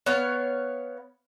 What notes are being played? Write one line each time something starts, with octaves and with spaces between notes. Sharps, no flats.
B3 C#5 F5